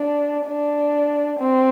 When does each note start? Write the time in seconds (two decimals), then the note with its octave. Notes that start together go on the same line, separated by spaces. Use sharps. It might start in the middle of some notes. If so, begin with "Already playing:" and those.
Already playing: D4
0.46 D4
1.40 C4